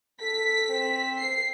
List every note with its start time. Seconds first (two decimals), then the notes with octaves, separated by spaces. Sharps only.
0.21 A4 B6
0.69 C4
1.18 C7